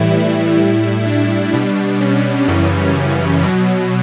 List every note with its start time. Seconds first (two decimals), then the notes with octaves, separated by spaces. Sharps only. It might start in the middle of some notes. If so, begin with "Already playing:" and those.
Already playing: A2 E3 G3 E4
0.11 E4
0.58 A2 G3
1.06 D4
1.53 B2 G3
2.01 C#4
2.48 F#2 C#3 E3 G3
3.43 B2 F#3